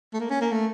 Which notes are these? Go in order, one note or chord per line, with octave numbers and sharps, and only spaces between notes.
A3
A#3
C#4
A#3
A3